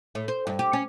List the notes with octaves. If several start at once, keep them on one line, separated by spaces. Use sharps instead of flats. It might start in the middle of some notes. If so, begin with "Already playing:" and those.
A2
C5
G2
G4
C#4